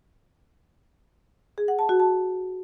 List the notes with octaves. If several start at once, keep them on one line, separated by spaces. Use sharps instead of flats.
G#4
F#5
A5
F#4
A5